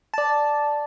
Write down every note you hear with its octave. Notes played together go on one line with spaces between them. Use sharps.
D5 A5